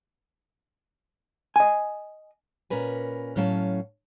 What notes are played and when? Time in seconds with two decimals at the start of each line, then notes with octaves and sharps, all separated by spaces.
1.56 D#5 G#5
2.70 A#2 C#4 A#4 B4 G#5
3.36 A2 F#3 C#4 F5 A5